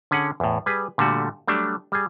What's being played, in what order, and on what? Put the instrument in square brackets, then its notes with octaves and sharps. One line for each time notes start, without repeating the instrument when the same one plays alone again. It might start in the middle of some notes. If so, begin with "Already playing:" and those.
[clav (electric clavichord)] D3 C#4 G#4 F#5
E2 A2
G3 G#4 B4
A#2 D3 G3 A3 F#4
F#3 G3 A3 D4
G3 G#4